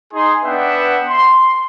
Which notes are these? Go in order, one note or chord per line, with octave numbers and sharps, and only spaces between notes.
D#4 G#4 C6
B3 D4 B4 E5 F#5 G5
C6